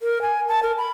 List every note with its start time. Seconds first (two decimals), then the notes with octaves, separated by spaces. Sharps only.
0.01 A#4
0.22 G#5
0.49 A5
0.63 A#4
0.78 B5